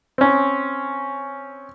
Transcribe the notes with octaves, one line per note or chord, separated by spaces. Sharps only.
C4 C#4